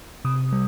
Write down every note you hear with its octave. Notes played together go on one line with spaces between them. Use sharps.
C3 D#6
G3